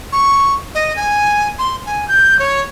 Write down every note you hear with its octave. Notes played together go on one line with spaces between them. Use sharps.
C#6
D#5
G#5
C6
G#5
G6
C#5